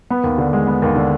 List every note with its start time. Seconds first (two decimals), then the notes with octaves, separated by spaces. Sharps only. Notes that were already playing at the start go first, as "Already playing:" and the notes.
0.10 B3
0.24 D#2
0.38 D3
0.53 G#3
0.67 B3
0.82 D#2
0.96 D3